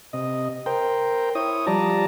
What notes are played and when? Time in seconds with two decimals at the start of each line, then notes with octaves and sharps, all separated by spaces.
0.13 C3 D#5
0.66 A#4 C5 G5
1.35 E4 C#5 D#6
1.67 F3 G3 D5 A5 A#5